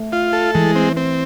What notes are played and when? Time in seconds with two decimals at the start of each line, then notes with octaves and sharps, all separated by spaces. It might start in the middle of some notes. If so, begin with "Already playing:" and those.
Already playing: A3
0.12 F4
0.33 A4
0.54 E3 G#3
0.75 C4
0.97 C4